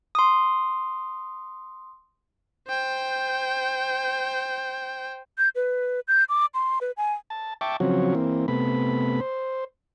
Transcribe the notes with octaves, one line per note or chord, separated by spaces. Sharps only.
C6 D#6
C5 G5
G6
B4
G6
D6
C6
B4
G#5
A5
E5 G5 A5 C#6 D6
C#3 F3 F#3 C4 F#4 C#5
E3 A#3 C4
C3 A3 B3 B5
C5